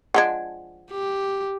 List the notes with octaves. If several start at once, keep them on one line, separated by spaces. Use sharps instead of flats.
F3 G#3 D4 F#5 G#6
G4